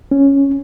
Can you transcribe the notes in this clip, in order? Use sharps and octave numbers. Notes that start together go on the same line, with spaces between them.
C#4